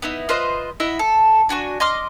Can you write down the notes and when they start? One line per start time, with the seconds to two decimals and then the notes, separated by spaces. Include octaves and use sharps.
0.02 B3 D#4 E4
0.29 F4 B4 C5 D#5
0.80 E4 D#5 E5 F#5
0.99 A4
1.49 D4 F#4 G#5 C#6
1.80 D#5 C6 D6 F6